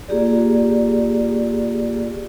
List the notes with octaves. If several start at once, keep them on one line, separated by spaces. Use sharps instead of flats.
A#3 F4 G4 G#4 D5